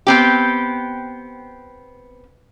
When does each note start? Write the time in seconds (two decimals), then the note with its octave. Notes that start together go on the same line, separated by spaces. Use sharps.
0.07 B3 C4 G4